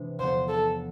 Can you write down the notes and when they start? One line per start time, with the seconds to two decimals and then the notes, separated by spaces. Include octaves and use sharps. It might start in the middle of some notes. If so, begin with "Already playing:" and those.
Already playing: C3 E3 G#3 D4
0.19 E2 D3 F3 B3 C5
0.48 A4